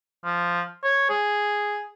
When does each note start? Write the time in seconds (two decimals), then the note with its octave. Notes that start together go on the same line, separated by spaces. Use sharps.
0.24 F3
0.84 C#5
1.10 G#4